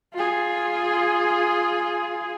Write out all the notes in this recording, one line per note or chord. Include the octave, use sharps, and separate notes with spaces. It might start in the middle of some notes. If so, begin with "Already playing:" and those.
F4 G#4